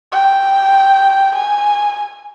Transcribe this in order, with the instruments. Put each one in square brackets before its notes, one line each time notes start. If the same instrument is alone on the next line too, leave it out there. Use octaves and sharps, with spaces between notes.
[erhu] G5
G#5